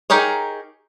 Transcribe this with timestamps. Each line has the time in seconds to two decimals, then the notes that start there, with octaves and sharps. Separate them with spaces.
0.10 D#4 G4 G#4 A#4 C#5